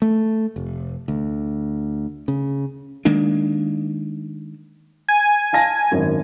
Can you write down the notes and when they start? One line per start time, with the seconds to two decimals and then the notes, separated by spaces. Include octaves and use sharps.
0.02 A3
0.56 F1
1.08 D2
2.28 C#3
3.05 D#3 G#3 A#3 D4
5.09 G#5
5.53 F5 A5 A#6
5.92 G#1 F#2